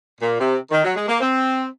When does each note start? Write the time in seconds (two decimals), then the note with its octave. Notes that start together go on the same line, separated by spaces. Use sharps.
0.21 A#2
0.40 C3
0.71 D#3
0.84 F#3
0.95 G#3
1.08 A#3
1.20 C4